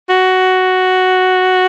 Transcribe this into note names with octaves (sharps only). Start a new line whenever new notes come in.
F#4